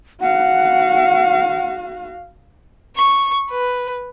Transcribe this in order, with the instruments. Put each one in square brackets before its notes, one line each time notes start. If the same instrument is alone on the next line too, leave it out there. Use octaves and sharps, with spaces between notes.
[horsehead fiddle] F#4 F5 [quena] F#5
[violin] C#6
B4